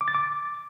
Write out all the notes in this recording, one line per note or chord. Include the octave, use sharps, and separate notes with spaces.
D6
A6
D6